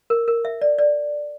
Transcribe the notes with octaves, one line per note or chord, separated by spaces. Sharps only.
A#4
A#4
E5
D5
D5